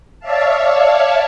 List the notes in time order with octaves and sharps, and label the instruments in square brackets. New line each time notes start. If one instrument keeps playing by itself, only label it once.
[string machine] C#5 D5 E5 F5 A5